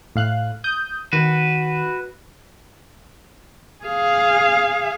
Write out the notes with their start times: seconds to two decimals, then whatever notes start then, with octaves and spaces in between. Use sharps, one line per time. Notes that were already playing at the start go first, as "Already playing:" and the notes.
0.15 A2 F5 F#6
0.64 D#6 G6
1.13 D#3 F#4 B4
3.84 G#4 F5